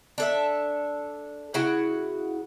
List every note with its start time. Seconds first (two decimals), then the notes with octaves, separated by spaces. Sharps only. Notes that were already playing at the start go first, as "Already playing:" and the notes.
0.18 D4 A4 E5
1.54 C#3 E4 F#4 F#5